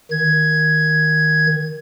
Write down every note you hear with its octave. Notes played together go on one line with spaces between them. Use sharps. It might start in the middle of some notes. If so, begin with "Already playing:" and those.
D#3 G#6